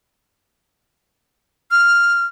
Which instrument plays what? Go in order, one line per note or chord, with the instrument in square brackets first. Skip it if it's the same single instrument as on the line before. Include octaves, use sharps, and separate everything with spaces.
[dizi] F6